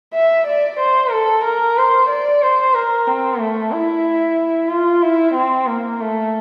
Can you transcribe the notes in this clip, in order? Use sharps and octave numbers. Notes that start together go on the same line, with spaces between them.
E5
D5
C5
A4
A#4
C5
D5
C5
A#4
C4
A3
E4
F4
E4
C4
A#3
A3